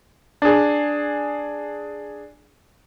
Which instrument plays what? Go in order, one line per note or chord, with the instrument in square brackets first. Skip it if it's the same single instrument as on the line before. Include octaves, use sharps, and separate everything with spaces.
[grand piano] D4 G#4